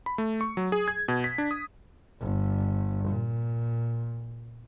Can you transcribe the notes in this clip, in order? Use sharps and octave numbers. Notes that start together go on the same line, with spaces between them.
B5
A3
C#6
F#3
G#4
G#6
B2
B6
D4
D#6
G1
A#2